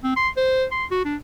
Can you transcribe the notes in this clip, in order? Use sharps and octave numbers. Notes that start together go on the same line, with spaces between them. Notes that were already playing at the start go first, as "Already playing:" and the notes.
C4
C6
C5
C6
F#4
D4